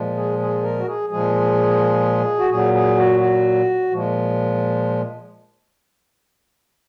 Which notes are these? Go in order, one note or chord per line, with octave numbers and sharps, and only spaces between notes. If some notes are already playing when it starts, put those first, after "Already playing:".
Already playing: A#2 F3 G#3
G#4
G#4
A#4
F#4
G#4
A#2 F3 G#3 G#4
F#4
A#2 F#3 G#4
G#4
F#4
F#4
A#2 F3 G#3